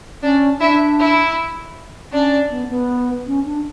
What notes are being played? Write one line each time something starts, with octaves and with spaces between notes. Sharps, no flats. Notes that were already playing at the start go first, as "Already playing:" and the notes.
C#4 D4 D5
D4 E4 E5
E4 E5
C#4 D4 D5
B3
B3
C#4
D4